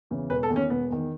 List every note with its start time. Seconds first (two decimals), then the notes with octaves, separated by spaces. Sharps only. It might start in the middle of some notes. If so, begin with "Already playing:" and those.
0.10 E2 C#3 E3
0.30 E1 B4
0.43 A4
0.49 E2 D#3
0.56 C#4
0.70 E1 B3
0.90 E2 D#3